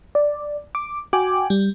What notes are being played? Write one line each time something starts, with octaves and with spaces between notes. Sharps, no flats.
D5
D6
F#4 G5 G#5 D6
G3